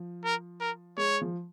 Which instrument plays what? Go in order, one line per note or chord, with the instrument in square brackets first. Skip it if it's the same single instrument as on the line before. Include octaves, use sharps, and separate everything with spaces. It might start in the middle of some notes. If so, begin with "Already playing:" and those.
Already playing: [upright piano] F3
[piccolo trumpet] A#4
A#4
[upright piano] G#3 [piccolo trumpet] C#5
[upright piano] F3